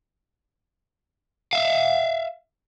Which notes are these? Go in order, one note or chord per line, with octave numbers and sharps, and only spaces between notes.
E5 F5